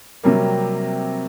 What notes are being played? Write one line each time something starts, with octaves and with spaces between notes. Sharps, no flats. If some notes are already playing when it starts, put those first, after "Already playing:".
C3 F#3 G3 A#3